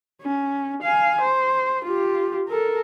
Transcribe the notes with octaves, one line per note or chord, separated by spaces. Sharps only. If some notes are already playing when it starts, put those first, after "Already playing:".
C#4
F5 G#5
C5
F4 G4
A4 A#4